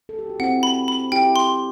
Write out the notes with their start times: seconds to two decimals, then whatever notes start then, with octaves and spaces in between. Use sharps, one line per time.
0.09 A4
0.19 G4
0.30 F#4
0.40 C4 E4 F#5
0.63 B5
0.88 B5
1.12 E4 G4 G5
1.36 C6